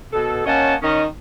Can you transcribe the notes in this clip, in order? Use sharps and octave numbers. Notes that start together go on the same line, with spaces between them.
B2 A4
A#3 C#4 C#5 D#5 F#5 A5
D#3 C#4 D#5